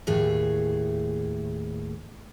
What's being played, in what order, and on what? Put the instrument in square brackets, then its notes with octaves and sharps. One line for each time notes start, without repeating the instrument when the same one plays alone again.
[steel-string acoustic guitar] D#2 A2 E3 G#4 C#5